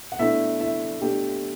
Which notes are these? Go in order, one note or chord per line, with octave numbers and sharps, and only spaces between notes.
F#5
B2 A3 D4 E4 E5
E4 E5
B2 A3 D4 G4 G5